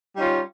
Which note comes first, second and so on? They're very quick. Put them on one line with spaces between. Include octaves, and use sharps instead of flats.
G3 D#4 C#4 F4